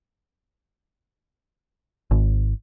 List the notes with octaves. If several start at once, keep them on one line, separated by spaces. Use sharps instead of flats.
G#1